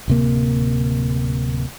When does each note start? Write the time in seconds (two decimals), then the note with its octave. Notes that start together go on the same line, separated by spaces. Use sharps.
0.08 D1 C3 A#3